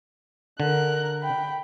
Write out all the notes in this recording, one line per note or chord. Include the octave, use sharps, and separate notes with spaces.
D3 A#4 F#6
G5 B5